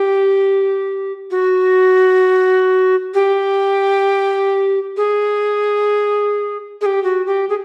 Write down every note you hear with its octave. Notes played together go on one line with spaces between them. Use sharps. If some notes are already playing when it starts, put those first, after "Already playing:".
Already playing: G4
F#4
G4
G#4
G#4
G4
F#4
G4
G#4